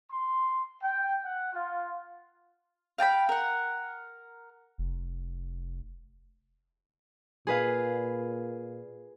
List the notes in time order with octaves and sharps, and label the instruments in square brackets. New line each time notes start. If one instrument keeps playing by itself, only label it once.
[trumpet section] C6
G5
F#5
F4
[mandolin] F5 G5 A5 B5
A#4 F#5
[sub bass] F1
[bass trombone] A#2 [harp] G#4 B4 F5